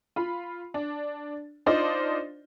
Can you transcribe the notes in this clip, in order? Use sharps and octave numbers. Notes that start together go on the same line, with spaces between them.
F4 B5
D4
D4 D#4 F4 C5 D5 D#5